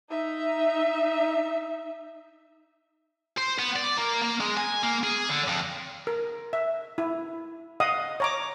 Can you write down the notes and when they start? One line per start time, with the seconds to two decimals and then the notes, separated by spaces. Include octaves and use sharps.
0.10 D#4 E5
3.38 C5
3.59 B3
3.76 D5
3.97 A#3
4.22 A#3
4.40 G#3
4.57 G#5
4.83 A#3
5.04 G#4
5.29 D3
5.48 F2
6.07 A#4
6.53 E5
6.98 E4
7.80 D#5 F5 F#5 D#6
8.20 C#5 A#5 D6